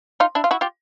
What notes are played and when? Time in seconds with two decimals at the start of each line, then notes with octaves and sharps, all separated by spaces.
0.20 D#4 F4
0.35 D4 E4
0.44 F4
0.51 E4 F#4
0.61 F4 G4